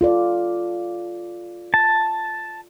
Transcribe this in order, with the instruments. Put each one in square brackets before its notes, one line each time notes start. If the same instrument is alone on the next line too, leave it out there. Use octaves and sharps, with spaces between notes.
[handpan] F4 A4 D5
[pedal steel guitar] A5